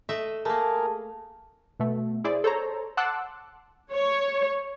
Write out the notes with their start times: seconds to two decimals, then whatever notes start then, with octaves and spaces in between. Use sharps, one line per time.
0.09 A3 D#5 E5
0.45 A3 A#3 G#4 A#4 A5
1.80 B2 A3
2.24 E4 G#4 C5 D5
2.44 A4 C5 C#5 A#5
2.97 F#5 A5 C6 D6 E6 F#6
3.92 C#5